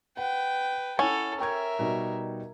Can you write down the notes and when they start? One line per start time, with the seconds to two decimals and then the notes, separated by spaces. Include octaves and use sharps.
0.17 B4 F#5 G5
0.99 C#4 E4 A4 F#5
1.40 A#4 E5 G5 C#6 G#6
1.79 B2 G3 D#4